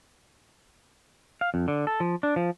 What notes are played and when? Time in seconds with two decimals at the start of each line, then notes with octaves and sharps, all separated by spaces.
1.41 F5
1.54 F2
1.68 D3
1.87 A4
2.00 F3
2.23 D4
2.36 F3